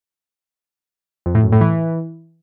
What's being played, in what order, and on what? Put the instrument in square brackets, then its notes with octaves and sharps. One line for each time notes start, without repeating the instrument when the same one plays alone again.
[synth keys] F2
A2
F#2
A2
E3